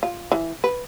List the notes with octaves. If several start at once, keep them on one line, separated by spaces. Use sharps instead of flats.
F4
E3
B4